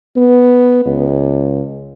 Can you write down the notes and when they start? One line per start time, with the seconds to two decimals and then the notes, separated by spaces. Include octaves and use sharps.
0.16 B3
0.85 C#2